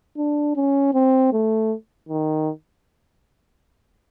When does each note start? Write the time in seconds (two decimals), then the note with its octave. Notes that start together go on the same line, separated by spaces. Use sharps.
0.17 D4
0.56 C#4
0.94 C4
1.33 A3
2.09 D#3